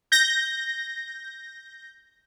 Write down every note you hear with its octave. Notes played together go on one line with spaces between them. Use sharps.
G6 A#6